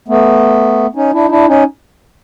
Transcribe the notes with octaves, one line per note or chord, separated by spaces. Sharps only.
A3 B3
C#4 D#4
D4 E4
D#4
D4 E4
C#4 D#4